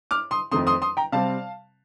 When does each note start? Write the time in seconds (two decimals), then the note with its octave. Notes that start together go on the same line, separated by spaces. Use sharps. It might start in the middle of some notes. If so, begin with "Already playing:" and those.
0.11 D6 F6
0.31 C6 D#6
0.52 F2 D#3 A3 C4 C6 D#6
0.67 C6 D#6
0.82 C6 D#6
0.97 G5 A#5
1.12 C3 G3 C4 F5 A5